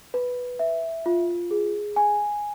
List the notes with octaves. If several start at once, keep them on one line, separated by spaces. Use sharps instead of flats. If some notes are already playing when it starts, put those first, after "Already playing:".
B4
E5
F4
G#4
G#5